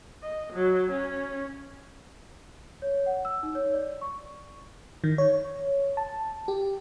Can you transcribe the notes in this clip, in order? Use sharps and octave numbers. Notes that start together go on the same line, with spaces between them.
D#5
F#3
C#4
C#5
F#5
E6
D#4
C#5
D5
C#6
D#3
C#5
A5
G4